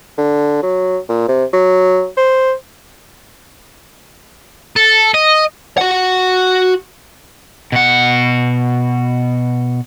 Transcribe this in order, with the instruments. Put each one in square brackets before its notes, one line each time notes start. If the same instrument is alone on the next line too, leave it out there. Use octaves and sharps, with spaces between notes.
[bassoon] D3
F#3
A#2
C3
F#3
C5
[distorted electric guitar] A4
D#5
[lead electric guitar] F#4 F#5
[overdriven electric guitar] B2 F#5